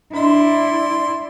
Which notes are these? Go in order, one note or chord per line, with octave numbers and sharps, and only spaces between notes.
D4 E4 D5 D#5 C6